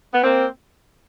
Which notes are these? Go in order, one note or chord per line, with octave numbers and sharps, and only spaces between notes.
B3
A#3 C4